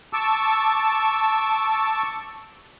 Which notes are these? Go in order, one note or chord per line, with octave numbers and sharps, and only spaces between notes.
A5 C#6 D6 E6